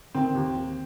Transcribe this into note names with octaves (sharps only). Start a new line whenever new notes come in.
D#3 C4
D#2
D#2